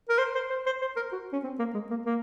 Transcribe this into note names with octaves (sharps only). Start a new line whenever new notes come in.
A#4
C5
C5
C5
C5
C5
A#4
F#4
C#4
C4
A#3
G#3
A#3
A#3